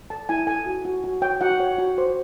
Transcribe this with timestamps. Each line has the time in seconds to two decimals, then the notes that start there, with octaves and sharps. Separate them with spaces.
0.10 A4 A5
0.29 E4 G#5
0.47 A4 G#5
0.66 F#4
0.85 F#4
1.04 F#4
1.22 C#5 G5
1.41 F#4 F#5
1.60 C#5
1.78 F#4
1.98 C5